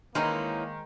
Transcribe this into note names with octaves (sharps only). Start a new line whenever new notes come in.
D#3 E3 G#3 A#3 C#4 D#4 A#4 C5